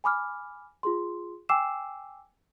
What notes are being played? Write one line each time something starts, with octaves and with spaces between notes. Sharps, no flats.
G#5 B5 D6 F6
F4 G#4 C6
G5 G#5 D6 E6 C7 E7